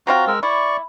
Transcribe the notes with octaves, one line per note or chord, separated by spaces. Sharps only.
F#3 C4 F4 F#4 A#5
G#3 A#4 E6
E4 D5 C#6